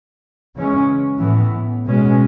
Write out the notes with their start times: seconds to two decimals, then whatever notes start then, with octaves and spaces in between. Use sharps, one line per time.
0.56 C#3 E3 G#3 C#4
1.21 A2 E3 B3
1.87 B2 G#3 C#4